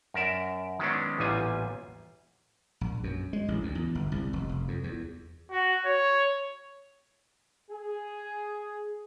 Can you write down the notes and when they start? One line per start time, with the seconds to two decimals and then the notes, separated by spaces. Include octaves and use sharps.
0.14 F#2 A#4 D5 E5
0.79 D#3 F#3 G#3 B3 C#4 D4
1.18 A1 E2 A#2 G3 F4 G#5
2.81 A#1
3.04 F#2
3.33 G#3
3.48 A1
3.63 D2
3.75 E2
3.95 G1
4.12 C2
4.33 F1
4.49 F1
4.68 F2
4.84 E2
5.51 F#4
5.86 C#5
7.70 G#4